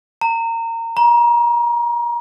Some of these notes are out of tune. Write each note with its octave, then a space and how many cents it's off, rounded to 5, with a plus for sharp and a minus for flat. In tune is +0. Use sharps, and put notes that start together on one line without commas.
A#5 -25
A#5 +30